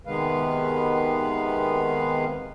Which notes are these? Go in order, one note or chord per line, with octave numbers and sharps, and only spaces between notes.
C3 D#3 G#3 B3 B4 F5